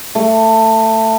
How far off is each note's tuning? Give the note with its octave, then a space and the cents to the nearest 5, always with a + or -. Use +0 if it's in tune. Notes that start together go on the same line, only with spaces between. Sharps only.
A3 +20